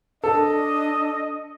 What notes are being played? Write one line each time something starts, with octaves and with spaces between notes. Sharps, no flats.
D4 A4 D#5